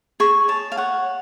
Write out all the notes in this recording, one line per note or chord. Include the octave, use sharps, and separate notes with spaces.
G#4 C#6
C#5 A5
F5
C#5 F#5